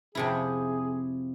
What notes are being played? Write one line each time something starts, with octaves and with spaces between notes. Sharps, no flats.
F2 C3 E4 G#4